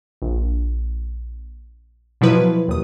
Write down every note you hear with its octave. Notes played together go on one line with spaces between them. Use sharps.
A#1
B2 F3 F#3 E4 B4
D#2 D#6